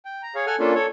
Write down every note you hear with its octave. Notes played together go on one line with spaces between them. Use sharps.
G5
A#5
G#4 C#5 F5
A4 F#5 G#5 F6
A#3 C#4 D4 F4 A4
A4 C#5